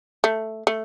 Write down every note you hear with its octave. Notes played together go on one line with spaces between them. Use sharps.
A3
A3